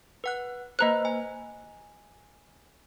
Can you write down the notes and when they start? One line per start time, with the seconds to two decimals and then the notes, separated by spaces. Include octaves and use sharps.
0.24 B4 F#5 F#6
0.79 A#3 B4 C5 D#5 A#5 F#6
1.05 G#5